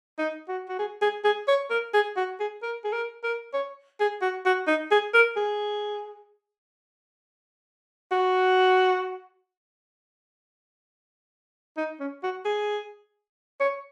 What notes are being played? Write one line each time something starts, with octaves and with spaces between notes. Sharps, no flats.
D#4
F#4
F#4
G#4
G#4
G#4
C#5
A#4
G#4
F#4
G#4
A#4
G#4
A#4
A#4
C#5
G#4
F#4
F#4
D#4
G#4
A#4
G#4
F#4
D#4
C#4
F#4
G#4
C#5